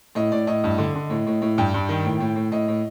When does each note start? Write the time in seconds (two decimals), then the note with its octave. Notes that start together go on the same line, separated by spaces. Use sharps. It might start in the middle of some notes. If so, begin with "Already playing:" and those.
0.15 A2 D#5
0.32 A2 D5
0.47 A2 D#5
0.64 G2
0.78 D3
0.95 D3
1.10 A2
1.27 A2
1.42 A2
1.58 G2 G5
1.74 G2
1.89 D#3
2.05 A2
2.20 A2
2.36 A2
2.52 A2 D#5
2.68 A2